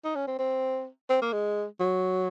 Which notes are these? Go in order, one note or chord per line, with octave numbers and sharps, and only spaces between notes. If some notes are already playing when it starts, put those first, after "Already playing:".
D#4
C#4
C4
C4
C4
A#3
G#3
F#3